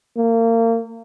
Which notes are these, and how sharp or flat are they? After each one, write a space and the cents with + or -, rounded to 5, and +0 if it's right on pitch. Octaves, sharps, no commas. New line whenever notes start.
A#3 -30